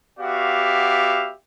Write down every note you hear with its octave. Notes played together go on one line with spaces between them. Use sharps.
B3 F#4 G4 D5 E5 F5